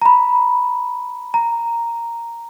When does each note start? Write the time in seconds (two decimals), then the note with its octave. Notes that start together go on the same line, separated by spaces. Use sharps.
0.02 A#5
0.06 B5
1.34 A#5